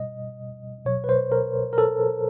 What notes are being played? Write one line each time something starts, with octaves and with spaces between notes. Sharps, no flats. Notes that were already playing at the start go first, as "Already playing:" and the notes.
Already playing: B2 G3 D#5
B2 F#3 C#5
B4
C5
A#4
A#4
A4